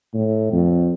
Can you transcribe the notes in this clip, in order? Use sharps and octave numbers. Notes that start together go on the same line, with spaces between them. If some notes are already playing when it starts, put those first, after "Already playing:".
A2
F2